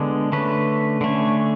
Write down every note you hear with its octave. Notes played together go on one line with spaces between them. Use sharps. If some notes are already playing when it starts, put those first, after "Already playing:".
Already playing: D3 G#3 B3 D4
D3 A3 C#4 B4
D3 A3 C#4